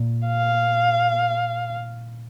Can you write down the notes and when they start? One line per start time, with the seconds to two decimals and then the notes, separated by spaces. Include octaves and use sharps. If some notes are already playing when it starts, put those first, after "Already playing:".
Already playing: A#2
0.27 F5